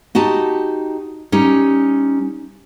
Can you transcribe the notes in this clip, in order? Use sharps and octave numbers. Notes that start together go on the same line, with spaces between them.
D#4 F#4 G4 A5
G3 C#4 D#4